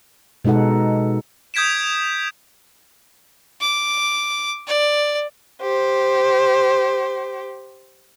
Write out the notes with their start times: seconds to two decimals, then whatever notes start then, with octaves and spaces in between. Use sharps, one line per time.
0.45 B2 G#3 D#4 A4 F#5
1.54 D#6 G6 G#6 B6 D7 E7
3.61 D6
4.67 D5
5.62 G4 C5